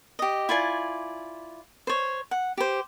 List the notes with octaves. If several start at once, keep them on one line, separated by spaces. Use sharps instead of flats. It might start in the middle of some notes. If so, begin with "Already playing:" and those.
G4 D#5
E4 F4 D5 G#5
C5 C#5
F#5
G4 C5